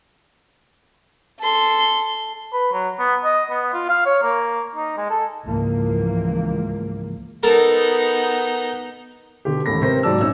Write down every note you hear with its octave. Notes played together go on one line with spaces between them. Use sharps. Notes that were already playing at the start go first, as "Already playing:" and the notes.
A4 C6
B4
F#3
B3
D#5
B3
F4
F5
C#5
A#3
D#4
G#3
A4
C#2 G#2 C#3 E3 F3 A#3
B3 D#4 A4 A#4
B2 D3 G4
A1 D#2 G#2 A4 B5 A#6
C3 B3 A#4 C5 A#6
G#2 F#3 D5 A5 E6
A#1 C#4 D#4 E6